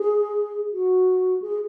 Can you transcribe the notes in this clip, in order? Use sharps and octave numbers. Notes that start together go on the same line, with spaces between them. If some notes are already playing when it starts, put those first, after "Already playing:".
Already playing: G#4
F#4
G#4